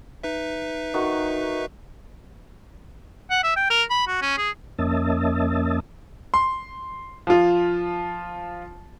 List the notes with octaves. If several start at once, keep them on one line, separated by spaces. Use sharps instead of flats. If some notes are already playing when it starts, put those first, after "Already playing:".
D#4 B4 E5
D#3 F#4
F#5
E5
G5
A#4
B5
F#4
C#4
G#4
F2 A#3 C#4 D#5 E5 A5
C6
F3 F4